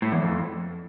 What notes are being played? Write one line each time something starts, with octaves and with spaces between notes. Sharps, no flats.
A2
E2
F2